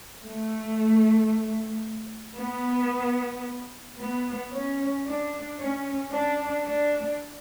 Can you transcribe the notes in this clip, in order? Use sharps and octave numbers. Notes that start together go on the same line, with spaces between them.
A3
B3
B3
C#4
D4
C#4
D4
D4